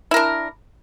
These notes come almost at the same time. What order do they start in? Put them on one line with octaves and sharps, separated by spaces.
E4 A#4 D4